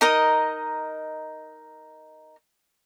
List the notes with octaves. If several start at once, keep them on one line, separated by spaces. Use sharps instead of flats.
D#4 A#4 D#5